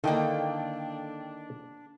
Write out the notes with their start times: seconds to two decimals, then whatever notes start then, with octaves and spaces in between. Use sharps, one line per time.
0.04 D3 D#3 A#3 D4 E4 A4 D#5 G5